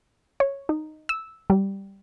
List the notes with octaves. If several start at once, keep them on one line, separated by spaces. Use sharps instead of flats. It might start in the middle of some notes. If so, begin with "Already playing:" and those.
C#5
D#4
E6
G3